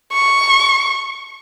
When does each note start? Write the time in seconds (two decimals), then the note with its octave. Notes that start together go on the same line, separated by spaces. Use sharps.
0.13 C#6